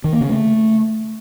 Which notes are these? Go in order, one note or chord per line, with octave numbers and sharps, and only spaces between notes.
D#3
A#3
C#3
A3